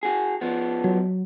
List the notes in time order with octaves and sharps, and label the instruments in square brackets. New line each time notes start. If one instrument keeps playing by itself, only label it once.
[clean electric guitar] F#4 G#4
F3 B3
[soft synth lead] F#3